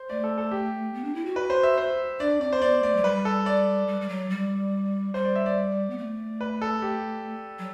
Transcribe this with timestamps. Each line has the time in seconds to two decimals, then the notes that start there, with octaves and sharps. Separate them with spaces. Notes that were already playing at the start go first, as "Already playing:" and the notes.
Already playing: C5
0.10 A3 D5
0.24 A4
0.38 A4
0.51 G4
0.94 B3
1.04 D4
1.15 E4
1.26 F#4
1.36 B4
1.50 C5
1.63 E5
1.78 C5
2.19 D4 D5
2.41 C4 D5
2.53 C5
2.58 C4
2.62 B3 D5
2.83 A3 D5
2.96 F#3
3.04 G3 B4
3.25 A4
3.46 D5
3.88 G3
4.01 G3
4.09 F#3
4.30 G3
5.14 G3 C5
5.24 D5
5.36 E5
5.46 D5
5.90 B3
5.98 A3
6.41 B4
6.62 A4
6.82 G4
7.59 F#3